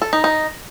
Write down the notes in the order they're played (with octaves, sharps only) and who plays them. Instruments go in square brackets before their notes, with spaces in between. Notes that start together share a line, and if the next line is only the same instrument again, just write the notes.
[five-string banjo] A4
D#4
D#4